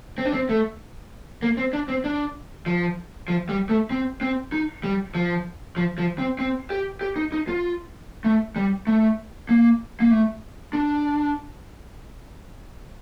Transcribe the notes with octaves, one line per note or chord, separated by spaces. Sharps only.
C4
D4
C4
A3
A#3
C4
D4
C4
D4
F3
F3
G3
A3
C4
C4
D#4
G3
F3
F3
F3
C4
C4
G4
G4
D#4
D#4
F4
A3
G3
A3
A#3
A#3
A3
D4